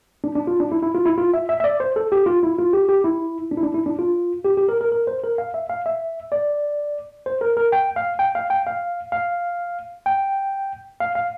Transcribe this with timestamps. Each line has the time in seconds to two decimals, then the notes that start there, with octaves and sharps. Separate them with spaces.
0.24 D4
0.35 D4
0.47 F4
0.60 D4
0.72 E4
0.82 E4
0.95 F4
1.06 E4
1.18 F4
1.34 E5
1.49 E5
1.60 E5
1.64 D5
1.80 C5
1.96 A4
2.12 G4
2.26 F4
2.43 E4
2.59 F4
2.73 G4
2.89 G4
3.04 E4
3.51 D4
3.57 E4
3.63 D4
3.74 E4
3.86 D4
3.99 F4
4.44 G4
4.57 G4
4.69 A#4
4.81 A#4
4.92 A#4
5.07 C5
5.24 A#4
5.38 F5
5.54 E5
5.70 F5
5.86 E5
6.32 D5
7.26 C5
7.41 A#4
7.57 A#4
7.72 G5
7.96 F5
8.19 G5
8.35 F5
8.50 G5
8.67 F5
9.12 F5
10.06 G5
11.00 F5
11.15 F5